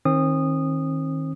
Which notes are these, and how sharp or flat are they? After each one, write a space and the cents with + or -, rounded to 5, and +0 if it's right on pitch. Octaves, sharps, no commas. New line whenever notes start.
D#3 +15 C4 +40 D#6 -15